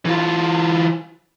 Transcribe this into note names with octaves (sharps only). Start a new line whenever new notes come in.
E3 F4